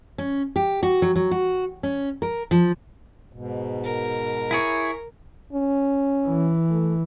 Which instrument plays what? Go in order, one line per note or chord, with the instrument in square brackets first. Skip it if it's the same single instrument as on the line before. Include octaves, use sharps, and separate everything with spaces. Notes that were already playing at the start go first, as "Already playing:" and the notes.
[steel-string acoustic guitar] C#4
G4
F#4
F#3
F#3
F#4
C#4
A#4
F3
[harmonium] G#2 B2
[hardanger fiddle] A#4
[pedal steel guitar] E4 G#4 C#5
[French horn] C#4
[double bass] E3
[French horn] A3